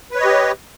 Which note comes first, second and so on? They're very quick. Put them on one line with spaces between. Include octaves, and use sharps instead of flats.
B4 C#5 D#5 G4